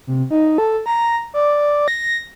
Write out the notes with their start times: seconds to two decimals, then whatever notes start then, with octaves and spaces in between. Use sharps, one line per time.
0.07 C3
0.31 D#4
0.58 A4
0.86 A#5
1.34 D5
1.88 A#6